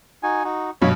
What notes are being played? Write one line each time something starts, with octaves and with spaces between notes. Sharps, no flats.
D#4 F#4 G#5
D#4 F#4
G2 B2 F#3 C#5 B5